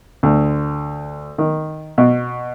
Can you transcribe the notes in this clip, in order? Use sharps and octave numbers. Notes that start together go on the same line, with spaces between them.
D2
D#3
B2